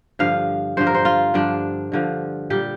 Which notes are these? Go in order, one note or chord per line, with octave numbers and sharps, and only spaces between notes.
G2 D3 F3 F5
G2 D3 F3 C5
A#4
C5
F4
G2 D3 F3 D4
G2 D3 F3
A#2 G3 G4